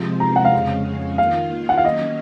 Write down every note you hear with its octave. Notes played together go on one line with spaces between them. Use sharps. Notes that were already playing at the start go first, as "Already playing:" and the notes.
Already playing: C3 F3 G#3 C4 F4
A#5
F#5
F5
F2 C#3 G#3 C#4
D#3 A#3 F4 F5
F#5
F5
D#3 F#3 A#3 C#4 D#5